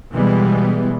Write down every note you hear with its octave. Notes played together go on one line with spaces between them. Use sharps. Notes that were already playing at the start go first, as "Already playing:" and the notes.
B2 E3 G3 G#3 B3